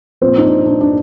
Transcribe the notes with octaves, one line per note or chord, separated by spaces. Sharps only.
A#2 F3 C4
D#4
D4
D4
D4